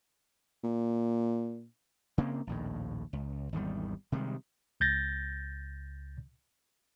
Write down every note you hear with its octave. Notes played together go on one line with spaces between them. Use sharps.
A#2
C#3 A#3 C4
A#1 D#2 A2
C#2
G#1 E2 D#3 G3
C3 D#3 G3 G#3
C#2 G6 A6 A#6